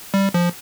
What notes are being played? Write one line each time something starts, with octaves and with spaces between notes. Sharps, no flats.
G3
F3